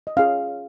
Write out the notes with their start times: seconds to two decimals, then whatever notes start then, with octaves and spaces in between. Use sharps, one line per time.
0.07 D#5
0.17 C#4 F4 G#4 C#5 F5